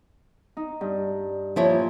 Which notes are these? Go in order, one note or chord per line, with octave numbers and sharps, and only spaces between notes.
D#4
G2
A#2 F3 E4 C#5